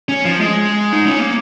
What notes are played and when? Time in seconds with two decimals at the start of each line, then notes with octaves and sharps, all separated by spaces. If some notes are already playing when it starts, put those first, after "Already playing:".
0.09 C#4
0.25 F3
0.40 G#3
0.93 D#4
1.06 C#4
1.19 A#3